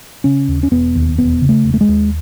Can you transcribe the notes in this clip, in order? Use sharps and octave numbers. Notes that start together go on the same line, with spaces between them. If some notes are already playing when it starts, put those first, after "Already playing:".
C#3 C#4
D#2
C#4
E1 B3
D#2
E1 B3
C#3
A3
E1
A3
G#3
D#2